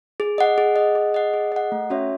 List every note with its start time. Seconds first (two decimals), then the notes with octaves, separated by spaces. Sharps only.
0.20 G#4
0.38 D#5 F#5
0.58 G#4
0.76 D#5 F#5
0.95 G#4
1.14 D#5 F#5
1.33 G#4
1.52 D#5 F#5
1.72 A3
1.90 C#4 F#4 C#5 E5